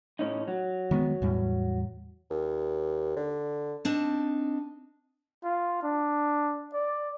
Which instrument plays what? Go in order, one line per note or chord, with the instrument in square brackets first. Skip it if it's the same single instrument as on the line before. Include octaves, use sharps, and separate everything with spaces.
[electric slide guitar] A2 C#4 D#4
F#3
[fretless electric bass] D#3 G#3 B3
E2 A2 G3
[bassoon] D#2
D3
[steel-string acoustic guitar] C4 D4 D#4 A5
[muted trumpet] F4
D4
D5